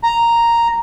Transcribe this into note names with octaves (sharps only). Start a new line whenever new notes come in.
A#5